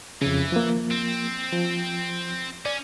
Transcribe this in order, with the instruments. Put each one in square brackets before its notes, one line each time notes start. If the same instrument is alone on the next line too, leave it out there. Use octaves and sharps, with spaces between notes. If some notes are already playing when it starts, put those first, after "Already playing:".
[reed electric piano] F2 C#3 [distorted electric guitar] E3
[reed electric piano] F3 A#3
[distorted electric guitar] C4
[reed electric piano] F3
[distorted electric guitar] C#4 [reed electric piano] D5